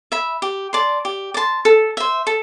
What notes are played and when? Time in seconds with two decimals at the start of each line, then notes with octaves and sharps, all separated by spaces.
0.12 E5 B5
0.42 G4
0.73 D5 A5 C6
1.05 G4
1.34 D5 A5 C6
1.65 A4
1.97 C5 E5
2.27 A4